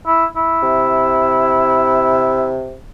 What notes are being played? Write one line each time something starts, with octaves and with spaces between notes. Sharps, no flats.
E4
E4
C3